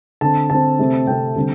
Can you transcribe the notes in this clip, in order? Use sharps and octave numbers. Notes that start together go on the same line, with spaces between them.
D3 C4 A5
D3 C4 A5
C3 A3 C4
C3 A3 C4 G5
D3 G3 C4